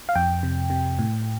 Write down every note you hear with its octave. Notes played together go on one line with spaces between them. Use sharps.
F5
F2 G5
C3
C3
A2